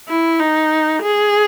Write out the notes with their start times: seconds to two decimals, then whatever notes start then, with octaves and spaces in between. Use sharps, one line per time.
0.08 E4
0.39 D#4
1.02 G#4